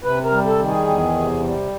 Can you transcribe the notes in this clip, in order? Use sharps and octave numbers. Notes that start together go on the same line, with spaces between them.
C3 B4
A#4
G3
A4
D#3
G#4
E2
C3
G3